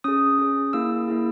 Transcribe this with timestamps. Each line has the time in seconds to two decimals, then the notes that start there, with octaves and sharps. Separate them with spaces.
0.04 C#4 G#4 D#6
0.39 C#4 G#4
0.73 A#3 E4 G#4 E6
1.08 A#3 E4 G#4